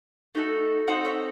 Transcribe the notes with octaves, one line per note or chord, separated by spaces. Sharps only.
A3 D#4 F#4 A4
C4 D#4 F#4 A4 D#5 F#5
C#5 E5